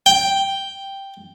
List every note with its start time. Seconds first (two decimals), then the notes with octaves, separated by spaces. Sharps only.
0.06 G5